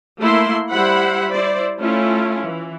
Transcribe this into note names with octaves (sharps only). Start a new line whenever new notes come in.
A3 A#3 E4 C6
G3 E4 C5 F#5 B5
E4 C5 D5
A3 C#4 E4 F4
E3